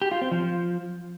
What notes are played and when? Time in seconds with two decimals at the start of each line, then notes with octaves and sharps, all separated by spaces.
0.02 G4
0.12 F4
0.22 C4
0.32 F3